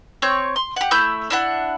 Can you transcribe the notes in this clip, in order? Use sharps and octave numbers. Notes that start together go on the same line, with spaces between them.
C4 C#5 C#6 G6
C6
G4 F#5
A3 E4 E6 G6
D4 E4 F#5